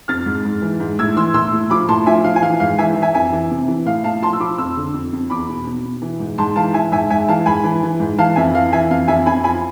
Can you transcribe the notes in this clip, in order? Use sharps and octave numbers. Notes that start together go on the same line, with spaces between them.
F2 F6 A6
G#2
G#2
E3
G#2
A2 E6 G#6
E3 C6 E6
A2 C6 E6
A2
F3 B5 D6
A2 A5 C6
F3 E5 G#5
F3 F5
G#5
E3 F5
G#2 F5
E3 E5 G#5
E3
E5 G#5
F2 E5 G#5
E3
C3
E3
A2 F5
A2 F5 A5
F3 A5 C6
E6
F3 B5 D6
F2 C6 E6
D3
F2
F2
E2 B5 D6
B2
B2
B2
E3
G#2
G#2 A5 C6
E3 F5 A5
E3 E5 G#5
G#2 E5 G#5
G#2 E5 G#5
E3 F5 A5
G#2 G#5 B5
E3
E3
G#2
E3 F5 A5
F2 E5 G#5
E3 F5
E3 E5 G#5
F2 F5
F2 E5 G#5
F2 G#5 B5
F3 G#5 B5